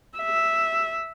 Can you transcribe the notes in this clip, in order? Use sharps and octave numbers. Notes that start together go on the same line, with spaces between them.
E5